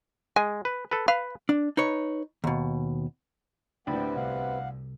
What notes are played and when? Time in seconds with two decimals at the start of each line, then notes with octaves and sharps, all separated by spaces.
0.36 G#3 G#5
0.65 B4
0.91 A4 B4
1.08 B4 F5
1.49 D4
1.77 D#4 B4 C#5
2.44 D#2 B2
3.87 D2 A2 C3 B3 D4 D5 G5 B5
4.16 C2 F5 F#5